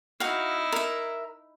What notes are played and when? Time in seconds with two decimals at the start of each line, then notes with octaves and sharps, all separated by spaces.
0.20 D#4 E4 F#4 F5
0.72 A#4 E5